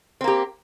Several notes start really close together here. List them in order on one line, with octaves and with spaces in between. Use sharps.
C4 A#3 G4